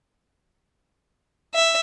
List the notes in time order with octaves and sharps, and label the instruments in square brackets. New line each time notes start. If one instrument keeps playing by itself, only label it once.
[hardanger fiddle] E5